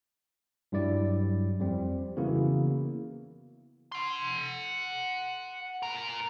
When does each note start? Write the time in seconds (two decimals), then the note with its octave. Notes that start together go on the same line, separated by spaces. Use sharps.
0.72 G2 F#3 G3 E4 D5
1.60 F2 G3 C4
2.17 C#3 E3 A#3 B3 E4 F#4
3.92 F#5 C6
5.83 A#2 A#4